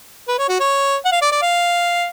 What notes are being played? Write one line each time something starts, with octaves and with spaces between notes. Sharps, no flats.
B4
C#5
F#4
C#5
F#5
F5
D5
D5
F5